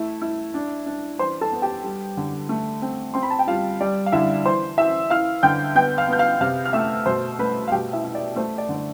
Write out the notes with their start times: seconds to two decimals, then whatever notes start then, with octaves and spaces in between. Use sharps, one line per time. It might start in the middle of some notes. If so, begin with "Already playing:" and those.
Already playing: A3 E4
0.22 E4
0.54 D4
0.86 D4
1.19 E3 C5 C6
1.41 A4 A5
1.52 B3
1.62 G4 G5
1.84 G3
2.17 D3
2.49 A3
2.82 C4
3.14 C4 C6
3.23 B5
3.30 A5
3.39 G5
3.47 G3 F4 F5
3.80 G3 D5
4.06 F5
4.12 D3 E4 E5
4.45 E3 C5 C6
4.78 E3 E5 E6
5.10 E4 F5 F6
5.43 D3 G5 G6
5.75 B3 G5 G6
5.98 F5 F6
6.08 B3 G6
6.19 F5 F6
6.41 C3 F5 F6
6.65 F6
6.73 A3 E5 E6
7.06 B2 C5 C6
7.39 A3 B4 B5
7.68 F5
7.72 B2 G4 G5
7.93 E4 E5
8.04 E4
8.15 D5
8.36 A3 C5
8.58 D5
8.69 D3
8.75 D5